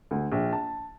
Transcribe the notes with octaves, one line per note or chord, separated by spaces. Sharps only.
D2
A#1
A5